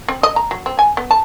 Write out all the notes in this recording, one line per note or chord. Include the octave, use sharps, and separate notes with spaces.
C4
D#5
A#5
F#3
C4
G#5
B3
A5